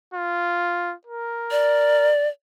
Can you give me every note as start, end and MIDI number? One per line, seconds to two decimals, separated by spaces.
0.14 0.95 65
1.07 2.11 70
1.51 2.28 74